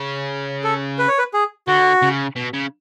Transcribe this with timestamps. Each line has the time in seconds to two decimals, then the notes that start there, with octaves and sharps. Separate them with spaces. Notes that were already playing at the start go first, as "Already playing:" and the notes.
Already playing: C#3
0.64 A4
0.99 B4
1.08 C#5
1.19 B4
1.33 G#4
1.67 D3 F#4
2.02 C#3
2.36 B2
2.54 C#3